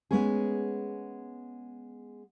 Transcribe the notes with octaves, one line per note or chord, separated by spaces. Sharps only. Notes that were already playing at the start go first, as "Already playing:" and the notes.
G#3 B3 C#4 G#4